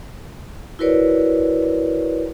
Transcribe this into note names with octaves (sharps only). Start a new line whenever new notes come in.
E4 F#4 A#4 B4 C#5 D5